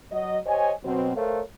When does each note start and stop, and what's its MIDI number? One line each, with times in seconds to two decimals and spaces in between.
0.11 0.39 54
0.11 0.39 75
0.46 0.72 67
0.46 0.72 72
0.46 0.72 73
0.46 0.72 75
0.46 0.72 80
0.83 1.12 47
0.83 1.12 54
0.83 1.12 60
1.16 1.41 57
1.16 1.41 69
1.16 1.41 70
1.16 1.41 72
1.16 1.41 73
1.16 1.41 77